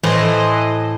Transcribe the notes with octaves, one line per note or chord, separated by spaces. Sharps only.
A2 E3 C5 D#5